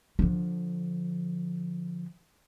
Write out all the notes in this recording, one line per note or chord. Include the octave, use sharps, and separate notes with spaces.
D3 F3